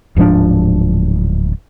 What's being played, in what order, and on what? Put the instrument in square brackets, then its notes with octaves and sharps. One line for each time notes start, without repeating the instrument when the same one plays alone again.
[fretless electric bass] D1 G#2 F3 D4